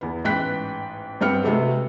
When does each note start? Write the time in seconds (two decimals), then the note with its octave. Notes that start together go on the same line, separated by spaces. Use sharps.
0.01 E2 B3
0.24 A1 G#2 B4 G5 F#6 B6
1.21 G2 B3 C4 G5 F6 C#7
1.44 C3 G#3 A3 B3 F#4 A4